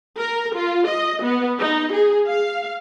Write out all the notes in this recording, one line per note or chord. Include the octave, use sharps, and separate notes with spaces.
A#4
F4
D#5
B3
D#4
G#4
F5